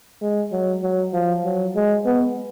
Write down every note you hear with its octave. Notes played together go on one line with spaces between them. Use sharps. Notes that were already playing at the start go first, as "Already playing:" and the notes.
G#3
F#3
F#3
F3
F#3
G#3
B3